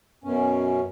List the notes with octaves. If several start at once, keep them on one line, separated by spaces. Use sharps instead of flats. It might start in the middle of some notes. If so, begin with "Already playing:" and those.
F#2 B2 C#4